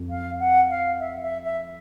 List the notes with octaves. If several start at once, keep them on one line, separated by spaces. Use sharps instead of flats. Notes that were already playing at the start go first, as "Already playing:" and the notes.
Already playing: F2
F5
F#5
F5
E5
E5
E5